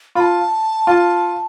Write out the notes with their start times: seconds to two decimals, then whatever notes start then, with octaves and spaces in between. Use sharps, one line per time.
0.15 F4 B5
0.20 A5
0.87 F4